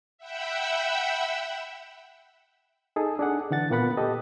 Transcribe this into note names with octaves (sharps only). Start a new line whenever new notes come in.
E5 F#5 G5 B5 E6
D#4 G#4 A4
D4 G#4 F#5
D3 E3 F#5 A6
A#2 A#3 B3 F#5 B5
G4 A4 D#5